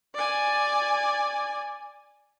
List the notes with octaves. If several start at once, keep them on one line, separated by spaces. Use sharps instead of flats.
D5 G#5